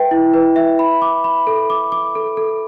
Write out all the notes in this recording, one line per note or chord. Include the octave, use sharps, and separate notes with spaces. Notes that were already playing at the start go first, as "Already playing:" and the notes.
Already playing: B4 E5 G5
E4
B4
E5
B5
D6
B5
A4
D6
D6
A4
A4